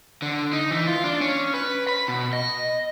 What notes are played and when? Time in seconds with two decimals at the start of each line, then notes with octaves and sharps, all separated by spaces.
0.22 D3
0.53 D#4
0.71 E3
0.87 F4
1.04 D4
1.21 C#4
1.54 B4
1.89 B5
2.08 B2
2.33 D#5